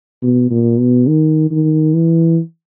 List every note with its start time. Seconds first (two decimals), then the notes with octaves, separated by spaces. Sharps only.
0.23 B2
0.51 A#2
0.79 B2
1.08 D#3
1.51 D#3
1.94 E3